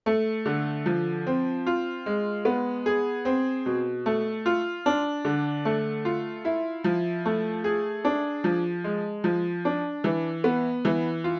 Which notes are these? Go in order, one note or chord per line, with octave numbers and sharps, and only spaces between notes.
A3
D3
F3
C4
F4
G#3
B3
G#4
C4
B2
A3
F4
D4
D3
A3
F4
E4
F3
A3
G#4
D4
F3
G#3
F3
D4
E3
B3
E3
F4